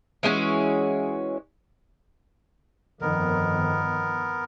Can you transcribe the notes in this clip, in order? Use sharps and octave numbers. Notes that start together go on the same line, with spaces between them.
E3 G#3 C#4 F#4
G1 F2 D#3 B3 A#4